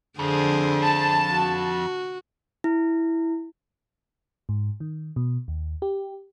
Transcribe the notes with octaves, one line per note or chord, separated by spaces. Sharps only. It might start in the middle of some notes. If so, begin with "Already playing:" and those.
F2 D3 G#4 C5
A5
F#4
E4
G#2
D#3
B2
D#2
G4